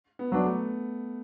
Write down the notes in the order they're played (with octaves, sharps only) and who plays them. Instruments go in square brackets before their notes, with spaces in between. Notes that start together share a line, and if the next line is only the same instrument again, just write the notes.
[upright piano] B3
[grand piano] F#3 D4
[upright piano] A3